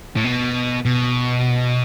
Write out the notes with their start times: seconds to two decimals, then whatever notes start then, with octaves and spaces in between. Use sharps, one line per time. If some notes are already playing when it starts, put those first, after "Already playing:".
0.16 A2
0.25 B2
0.85 B2